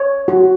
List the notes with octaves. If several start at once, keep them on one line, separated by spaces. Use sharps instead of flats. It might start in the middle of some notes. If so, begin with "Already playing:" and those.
Already playing: C#5
F#4